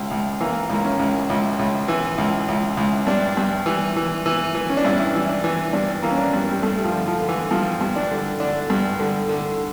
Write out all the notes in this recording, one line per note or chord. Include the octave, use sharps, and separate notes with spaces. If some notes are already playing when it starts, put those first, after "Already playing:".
Already playing: C#2
C#2
E3 A#3
C#2 A#3
C#4
C#2
C#2
C#2
E3
C#2
C#2
C#2
G2 D4
G2
E3
E3
E3
E3
C#4
D4
G2 E4
E3
D4
E3
G2 D4
E3 A#3
C#4
D4
G2
G3
G2 A3
F3
D3
F3
D3
E3
G2 F3
G2
D4
D3
D3 D4
G2
D3
D3